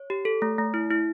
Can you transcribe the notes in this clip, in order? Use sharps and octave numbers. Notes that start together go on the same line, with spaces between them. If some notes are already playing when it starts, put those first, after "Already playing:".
Already playing: C#5
G4
A4
A3
A3
E4
E4